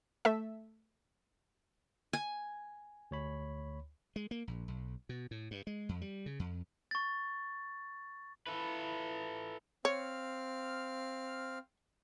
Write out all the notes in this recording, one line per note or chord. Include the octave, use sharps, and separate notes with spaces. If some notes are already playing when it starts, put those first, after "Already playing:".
A3 A4 E5
G#5
D2 C#5 B5
G#3
A#3
A#1
B1
B2
A2
G2
G#3
F2
G3
C#3
F2
C#6 A6
E3 F4 A4 B4
C4 C#5 F5 F6